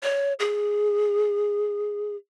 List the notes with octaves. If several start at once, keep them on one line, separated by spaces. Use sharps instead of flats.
C#5
G#4